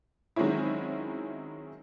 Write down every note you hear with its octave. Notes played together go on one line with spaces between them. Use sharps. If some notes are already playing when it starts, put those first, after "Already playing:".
D#3 F#3 G#3 C4 C#4 E4